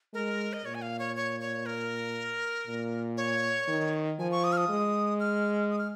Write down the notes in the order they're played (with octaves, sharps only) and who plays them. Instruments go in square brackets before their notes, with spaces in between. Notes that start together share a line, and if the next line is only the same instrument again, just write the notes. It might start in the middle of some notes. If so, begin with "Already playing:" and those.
[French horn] G#3 [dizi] A#4
[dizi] D#5
[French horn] A#2 [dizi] C#5
[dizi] G#5
F5
C#5
C#5
C#5
A#4
[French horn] A#2
[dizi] C#5
[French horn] D#3
[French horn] F3 [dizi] G#5
[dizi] C#6
D#6
F6
D#6
[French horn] G#3
[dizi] F6
D#6
F6